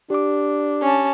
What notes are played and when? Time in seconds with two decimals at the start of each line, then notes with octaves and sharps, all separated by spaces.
0.10 D4 G4 D6
0.82 C#4 A5